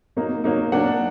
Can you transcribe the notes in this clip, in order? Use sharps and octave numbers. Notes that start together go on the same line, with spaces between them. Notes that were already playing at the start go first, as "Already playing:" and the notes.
F#3 A#3 D#4
F#3 A#3 D#4
F#3 A#3 D4 F#5